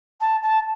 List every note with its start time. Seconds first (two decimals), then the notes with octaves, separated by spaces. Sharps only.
0.20 A5
0.42 A5